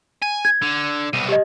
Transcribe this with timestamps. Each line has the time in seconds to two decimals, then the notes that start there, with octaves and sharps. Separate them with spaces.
0.22 G#5
0.45 G#6
0.62 D3
1.13 C2 B2 D#7
1.28 G4 D#5